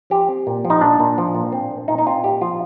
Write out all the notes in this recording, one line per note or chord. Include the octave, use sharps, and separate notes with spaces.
F3 G4
C4
A#2
F3
D#4
A#2 D4
A#2
F3
A#2
C4
A#2
A#2 D#4
D#4
C4 F4
A#2 G4
F3 F4